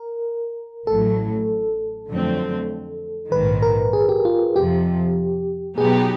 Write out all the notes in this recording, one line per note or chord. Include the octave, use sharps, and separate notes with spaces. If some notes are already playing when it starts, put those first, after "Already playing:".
Already playing: A#4
A1 A2 F#3 A4
F2 D3 F#3 A3 C4
A#1 G#2 D#3 B4
A#4
G#4
G4
F4
F2 C3 F3 G4
B2 F#3 B3 D#4 G4 G#4